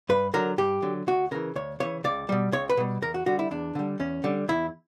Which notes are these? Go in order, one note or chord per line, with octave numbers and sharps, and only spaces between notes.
G2 B4
D3 F#3 A#4
G2 G4
D3 F#3
D2 F#4
C#3 E3 A#4
D2 C#5
C#3 E3 C#5
C#2 D5
B2 G3
C#2 C#5
B4
B2 G3
E2 A#4
F#4
D3 G3 F#4
E4
E2 D4
D3 G3
E2 C#4
D3 G3
E2 E4